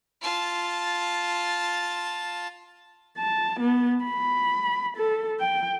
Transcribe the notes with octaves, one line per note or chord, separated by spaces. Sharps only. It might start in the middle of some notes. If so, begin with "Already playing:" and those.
F4 A5
A5
B3
B5
A4
G5